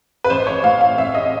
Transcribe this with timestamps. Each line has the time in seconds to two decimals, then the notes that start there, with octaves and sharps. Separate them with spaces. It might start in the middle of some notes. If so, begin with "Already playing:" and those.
0.24 B4
0.30 A1 C5
0.47 C#5
0.64 A2 F5
0.81 F5
0.98 A1 E5
1.14 D#5